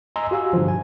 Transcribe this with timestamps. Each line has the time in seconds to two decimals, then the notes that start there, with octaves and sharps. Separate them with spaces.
0.16 D#5 G#5 A#5 C6 E6
0.31 F#4 G4 F5 G#5 E6
0.53 G2 B2 D3 E3 F3
0.68 G#5